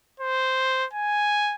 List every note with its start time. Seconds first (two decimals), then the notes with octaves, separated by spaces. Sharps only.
0.20 C5
0.93 G#5